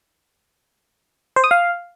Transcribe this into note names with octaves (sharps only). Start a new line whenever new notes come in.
C5
D#6
F5